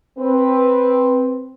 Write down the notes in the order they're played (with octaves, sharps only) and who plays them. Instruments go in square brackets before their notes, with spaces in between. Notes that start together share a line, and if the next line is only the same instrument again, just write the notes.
[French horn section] C4 B4